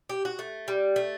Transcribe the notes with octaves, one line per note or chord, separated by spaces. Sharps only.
G4
F#4
A3
G3
A3